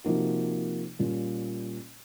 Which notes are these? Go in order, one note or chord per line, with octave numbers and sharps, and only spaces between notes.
C3 F3 A#3 D#4 F#4
A#2 G3 A#3 C#4 F4